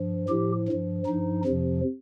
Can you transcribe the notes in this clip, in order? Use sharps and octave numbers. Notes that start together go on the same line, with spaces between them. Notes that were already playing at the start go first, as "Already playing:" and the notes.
Already playing: G2 F3
A2 F3 G4
G2 F3
G2 F3 D#4
F2 C3 F3